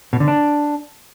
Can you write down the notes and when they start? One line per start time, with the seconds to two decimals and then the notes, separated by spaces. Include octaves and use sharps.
0.13 B2
0.20 D3
0.28 D4